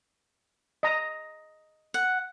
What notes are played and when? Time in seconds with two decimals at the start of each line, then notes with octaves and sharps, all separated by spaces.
0.83 D#5 A#5
1.94 F#5